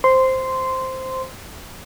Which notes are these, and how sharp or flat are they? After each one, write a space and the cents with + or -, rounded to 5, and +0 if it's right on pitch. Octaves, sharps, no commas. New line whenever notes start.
C5 +0 C6 -10